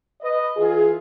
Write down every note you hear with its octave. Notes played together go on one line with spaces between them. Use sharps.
B4 D#5
E3 F4 G#4